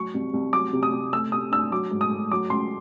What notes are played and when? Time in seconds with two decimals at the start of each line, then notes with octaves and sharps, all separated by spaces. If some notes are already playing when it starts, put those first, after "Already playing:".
Already playing: F#3 C#6
0.14 C2
0.33 C2
0.53 F#3 D6
0.73 C3
0.83 D#6
0.93 C3
1.12 A3 E6
1.32 C3 D#6
1.51 D4 E6
1.72 F#3 D6
1.91 G#2
2.01 D#6
2.11 A3
2.31 F#3 D6
2.50 C#2 C6